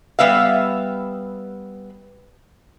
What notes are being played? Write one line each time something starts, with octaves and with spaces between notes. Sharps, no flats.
G3 B3 E5 F5